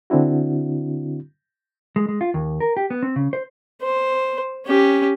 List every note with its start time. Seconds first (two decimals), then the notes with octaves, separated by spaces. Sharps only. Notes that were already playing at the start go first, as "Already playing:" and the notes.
0.10 D3 C4 D4 E4 F#4
1.96 G#3
2.08 G#3
2.21 F4
2.34 D#2
2.60 A#4
2.77 G4
2.90 B3
3.03 C4
3.16 C#3
3.33 C5
3.82 C5
4.66 C#4 G4